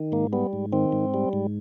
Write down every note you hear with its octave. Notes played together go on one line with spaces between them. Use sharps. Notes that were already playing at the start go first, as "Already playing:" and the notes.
Already playing: D#3
G#2 A#3
G3 B3
G#2
D#3 C4
G#2
G3
G#2